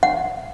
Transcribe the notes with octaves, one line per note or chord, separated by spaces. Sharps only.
F#5